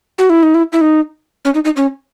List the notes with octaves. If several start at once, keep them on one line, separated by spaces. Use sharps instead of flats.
F#4
E4
D#4
E4
E4
D#4
C#4
D#4
D#4
C#4